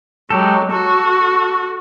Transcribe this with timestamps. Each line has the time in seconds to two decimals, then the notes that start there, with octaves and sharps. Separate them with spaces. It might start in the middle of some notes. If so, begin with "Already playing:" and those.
0.30 F#3 G#3 G4 A4
0.70 F#4 A4